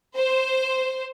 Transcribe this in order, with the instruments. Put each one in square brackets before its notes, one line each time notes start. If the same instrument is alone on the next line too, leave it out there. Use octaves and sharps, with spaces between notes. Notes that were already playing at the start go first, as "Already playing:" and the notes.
[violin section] C5